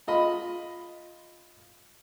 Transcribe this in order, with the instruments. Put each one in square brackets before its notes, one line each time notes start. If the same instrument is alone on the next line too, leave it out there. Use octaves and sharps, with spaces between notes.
[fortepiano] F4 D#5 B5